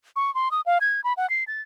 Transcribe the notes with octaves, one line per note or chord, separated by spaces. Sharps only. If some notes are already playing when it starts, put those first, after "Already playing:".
C#6
C6
D#6
F5
G#6
B5
F#5
C7
A6